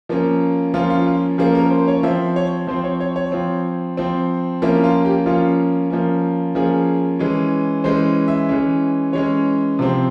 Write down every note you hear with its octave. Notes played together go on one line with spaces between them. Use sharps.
F3 A#3 C#4
F3 A#3 C#4 F4
F4
F4
F3 A#3 C#4 G#4
A#4
C5
C#5
F3 C4 E5
C#5
F3 C4 C5
C#5
C#5
C#5
F3 C4
F3 C4
F3 A#3 C#4 E4
F4
G4
F3 A#3 C#4 F4
F3 A#3 C#4
F3 A#3 C#4 G#4
E3 G#3 C#4
E3 G#3 C#4 C5
E5
E3 G#3 C#4
E3 G#3 C#4 C#5
C3 F3 C4